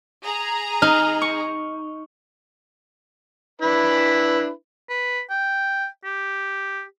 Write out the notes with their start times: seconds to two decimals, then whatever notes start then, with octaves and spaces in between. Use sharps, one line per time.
0.25 G#4 A#5
0.82 D#4 F6
1.21 C#6
3.62 D4 E4 B4
4.90 B4
5.30 G5
6.04 G4